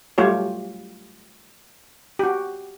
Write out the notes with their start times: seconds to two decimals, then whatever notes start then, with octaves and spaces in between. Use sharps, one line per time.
0.18 F#3 G3 A3 F4 G4 C#5
2.19 F#4 G4